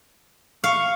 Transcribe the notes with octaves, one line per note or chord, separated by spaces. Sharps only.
F5 C#6